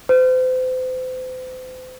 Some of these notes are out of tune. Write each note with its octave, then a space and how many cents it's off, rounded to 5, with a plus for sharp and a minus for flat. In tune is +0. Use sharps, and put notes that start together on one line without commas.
C5 -40